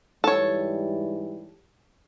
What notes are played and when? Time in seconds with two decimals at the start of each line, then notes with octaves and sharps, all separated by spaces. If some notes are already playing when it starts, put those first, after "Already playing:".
0.24 G#2 E3 G3 A4 C#5